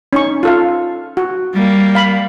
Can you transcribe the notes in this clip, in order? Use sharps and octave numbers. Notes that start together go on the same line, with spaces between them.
C#4 D#4 C#6
F4 A4 F5
F#4
G3 A#3
F5 B5